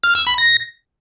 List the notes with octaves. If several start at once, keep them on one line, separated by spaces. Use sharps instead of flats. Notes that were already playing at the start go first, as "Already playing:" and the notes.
F6
E6
B5
A#6